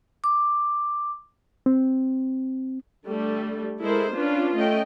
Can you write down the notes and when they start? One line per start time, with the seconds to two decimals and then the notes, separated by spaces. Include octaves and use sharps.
0.24 D6
1.66 C4
3.08 D3 G3 A3
3.82 G#3 E4 A4 A#4 C5
4.14 C#4 D4 F4 B4
4.55 A3 C#4 D#5 G5